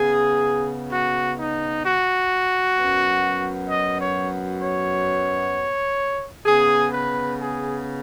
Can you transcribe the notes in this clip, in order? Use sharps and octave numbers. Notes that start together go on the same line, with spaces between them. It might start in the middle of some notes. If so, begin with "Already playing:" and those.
Already playing: C#3 B3 G#4
F#4
D#4
F#4
F#2 F#3 B3
D#5
C#5
C#5
C#3 B3 G#4
B4
G#4